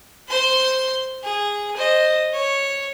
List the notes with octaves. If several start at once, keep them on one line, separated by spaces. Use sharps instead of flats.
C5 C6
G#4
C5 D#5
C#5